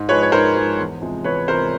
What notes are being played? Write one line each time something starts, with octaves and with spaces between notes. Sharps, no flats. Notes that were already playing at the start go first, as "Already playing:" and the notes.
Already playing: G#2
F3 G#3 B4 C#5
C#5
G#2 A#4 C5
F3 G#3
E2
C3 F3 G#3
E2 B4 C#5
C3 F3 G#3 A#4 C5